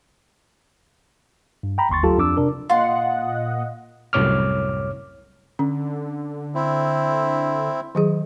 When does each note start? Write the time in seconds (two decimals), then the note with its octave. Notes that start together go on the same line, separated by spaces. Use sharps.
1.63 G2
1.78 G5 A#5 B5
1.89 G1 D#2 C6 C#6 A6
2.03 D2 F#3 F4 G4 A4 A5
2.18 F2 D4 D6 E6
2.37 C3 D4 A#4
2.69 A#2 F4 D#5 F#5 C6
4.13 C2 F#2 A2 C#5 D6 F6
5.59 D3 C#4
6.55 C4 E4
7.95 D#3 F#3 G#4